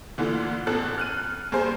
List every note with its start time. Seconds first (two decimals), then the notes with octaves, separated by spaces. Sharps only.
0.18 D2 A#2 D3 E3
0.67 A1 E2 A4 F#6
0.98 F6 F#6 D#7
1.52 G2 A#3 G#4 C5